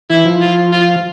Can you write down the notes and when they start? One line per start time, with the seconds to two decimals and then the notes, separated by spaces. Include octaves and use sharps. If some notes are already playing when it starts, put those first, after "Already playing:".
0.10 E3 E4
0.26 F3
0.41 F4
0.72 F4